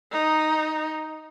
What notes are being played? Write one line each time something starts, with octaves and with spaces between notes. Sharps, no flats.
D#4